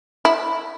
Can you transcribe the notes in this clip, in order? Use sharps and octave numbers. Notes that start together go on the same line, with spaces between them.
E4